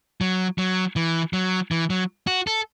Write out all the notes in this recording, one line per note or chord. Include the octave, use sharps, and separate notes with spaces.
F#3
F#3
E3
F#3
E3
F#3
F#4
A4